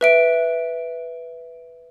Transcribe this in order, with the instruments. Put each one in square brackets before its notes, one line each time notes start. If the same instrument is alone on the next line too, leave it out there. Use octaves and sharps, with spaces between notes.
[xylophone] B4 E5 D7